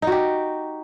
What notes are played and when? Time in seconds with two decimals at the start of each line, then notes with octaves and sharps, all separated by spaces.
0.02 D#4
0.07 F#4
0.12 G4